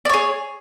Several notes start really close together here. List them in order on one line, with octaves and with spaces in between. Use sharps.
D5 C#5 G#4